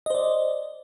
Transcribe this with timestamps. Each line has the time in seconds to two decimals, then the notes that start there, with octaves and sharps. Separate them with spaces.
0.06 D#5
0.10 C5
0.15 D5